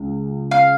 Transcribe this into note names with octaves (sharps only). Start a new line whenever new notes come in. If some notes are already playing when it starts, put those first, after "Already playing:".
Already playing: C#2
F5